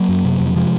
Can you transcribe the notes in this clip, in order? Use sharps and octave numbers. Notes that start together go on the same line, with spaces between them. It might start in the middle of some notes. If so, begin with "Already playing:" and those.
Already playing: F#3 A#3
F#2
C3
F2
C3 F3 G#3